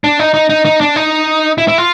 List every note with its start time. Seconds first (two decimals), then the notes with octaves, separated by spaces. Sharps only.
0.04 D4
0.19 D#4
0.34 D#4
0.50 D#4
0.65 D#4
0.81 D4
0.96 D#4
1.58 E4
1.68 E4
1.78 F4